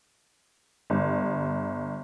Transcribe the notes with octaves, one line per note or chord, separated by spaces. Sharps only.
G1